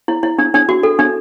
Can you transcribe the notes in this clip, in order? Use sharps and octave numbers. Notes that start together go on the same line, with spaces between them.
E4
E4
D4
D4
F#4
A4
D4